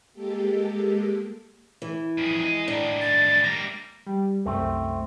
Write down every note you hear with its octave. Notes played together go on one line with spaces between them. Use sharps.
G#3 A#3 G4 A4
E3
F2 G#4
G#4 D#5
A2 D#3 D4
A6
G3 A#3 A#6
G3
C2 F#2 A3 C4